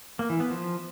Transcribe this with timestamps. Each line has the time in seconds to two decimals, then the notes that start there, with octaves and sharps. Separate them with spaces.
0.19 A#3
0.30 E3
0.40 B3
0.50 F3